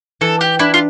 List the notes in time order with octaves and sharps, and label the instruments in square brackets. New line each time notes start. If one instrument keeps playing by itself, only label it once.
[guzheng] E3 [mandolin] A4
[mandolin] G4
[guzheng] D4 [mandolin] E4
[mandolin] F4